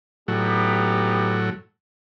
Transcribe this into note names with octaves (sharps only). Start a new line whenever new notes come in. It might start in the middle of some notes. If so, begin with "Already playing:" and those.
A2 F#3 B3 D#4 G4